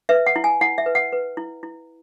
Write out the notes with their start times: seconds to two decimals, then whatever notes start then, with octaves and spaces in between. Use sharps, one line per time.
0.09 B4 E5
0.26 F#5
0.36 E4
0.44 G#5
0.61 E4 F#5
0.78 E5
0.86 B4
0.95 F#5
1.13 B4
1.37 E4
1.63 E4